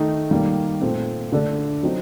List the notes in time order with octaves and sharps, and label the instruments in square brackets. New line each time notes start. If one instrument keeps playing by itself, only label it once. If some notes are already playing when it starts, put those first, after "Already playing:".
Already playing: [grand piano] D#3 A3 D#4
D#3 G3 A#3
A#2 A3 C4
D3 A3 D4 A4 D5
F#3 C4 D#4